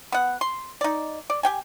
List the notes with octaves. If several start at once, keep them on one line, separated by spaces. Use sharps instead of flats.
B3 F#5
C6
D#4 D5
D5
G4 G5 G#5